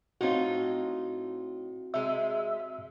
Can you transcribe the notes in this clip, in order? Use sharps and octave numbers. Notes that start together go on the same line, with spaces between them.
A2 C4 D#4 F4 F#4
C3 G#3 E5